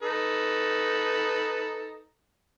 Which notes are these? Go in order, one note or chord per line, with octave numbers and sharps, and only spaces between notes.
D#4 A4 B4